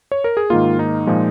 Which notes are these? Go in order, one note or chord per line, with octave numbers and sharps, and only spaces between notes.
C#5
A#4
G#4
G#2 D#3 A#3 F4
D#4
A#2 F3 G#3